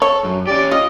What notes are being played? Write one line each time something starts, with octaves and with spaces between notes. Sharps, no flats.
A4 C#5
F#2
C#4 G4 D5
F4 D#5